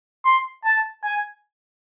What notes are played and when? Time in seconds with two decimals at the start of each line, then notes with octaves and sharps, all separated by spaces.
0.25 C6
0.65 A5
1.04 G#5